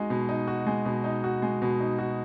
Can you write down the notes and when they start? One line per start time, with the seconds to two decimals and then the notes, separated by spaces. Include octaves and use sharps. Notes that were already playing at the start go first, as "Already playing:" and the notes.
Already playing: G#3 D#4 F#4
0.10 B2
0.29 D#4
0.47 F#4
0.67 G#3
0.85 B2
1.04 D#4
1.24 F#4
1.42 G#3
1.62 B2
1.80 D#4
1.99 F#4